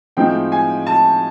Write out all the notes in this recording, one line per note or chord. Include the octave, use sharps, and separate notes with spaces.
A2 F3 G#3 C4 D#4 G5
G#5
A5